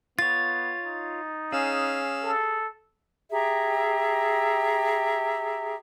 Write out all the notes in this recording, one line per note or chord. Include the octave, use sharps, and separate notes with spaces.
B3 F4 C#5 A6
D#4
C#4 G#4 F5 E6
A4
G4 G#4 E5 A#5